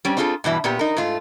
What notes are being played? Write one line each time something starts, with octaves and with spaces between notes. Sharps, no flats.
G3 C4 C#4
C4 D4 F4 G#4 A4
G2 B2 E3 E5
A#2 B3 G4
D#4 A#4
G#2 A3 F4